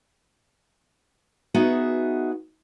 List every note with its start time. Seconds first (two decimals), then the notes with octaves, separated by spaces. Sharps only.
1.54 B3 D#4 F#4 G#4 E5